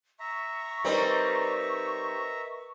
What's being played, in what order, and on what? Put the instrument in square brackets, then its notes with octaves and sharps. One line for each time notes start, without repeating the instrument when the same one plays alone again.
[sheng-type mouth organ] E5 A#5 [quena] C#6
[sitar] G3 C4 D#4 [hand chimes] A#4 B4 D#5